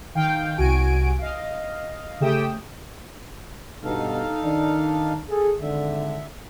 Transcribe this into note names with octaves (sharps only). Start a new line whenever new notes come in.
D#3 F5 G5
C2 F#4 G#5 D7
D#5 F5
C#3 A3 G4 G5 D#6 E7
G2 B2 D#4 A4 F5
D#3 D4
G#4 A4
G#1 D3 E5